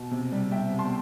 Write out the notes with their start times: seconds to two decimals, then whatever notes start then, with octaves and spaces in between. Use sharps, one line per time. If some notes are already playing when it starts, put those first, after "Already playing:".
Already playing: B2
0.11 C3
0.32 G3
0.51 C3 E5 G5
0.72 B3
0.79 A5 C6